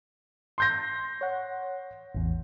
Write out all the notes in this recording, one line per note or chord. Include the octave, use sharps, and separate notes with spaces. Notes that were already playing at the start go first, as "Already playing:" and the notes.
C6 G6 A#6
C#5 F#5
A1 E2